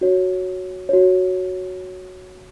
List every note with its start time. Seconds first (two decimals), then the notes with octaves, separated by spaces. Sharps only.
0.01 F#4 C#5
0.89 F#4 C#5